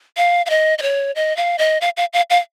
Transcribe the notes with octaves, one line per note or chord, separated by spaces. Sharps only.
F5
F5
D#5
D#5
C#5
D#5
F5
D#5
F5
F5
F5
F5